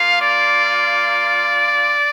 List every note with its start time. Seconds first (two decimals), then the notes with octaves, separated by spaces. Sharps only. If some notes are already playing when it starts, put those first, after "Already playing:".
Already playing: A#3 F4 F5
0.22 D5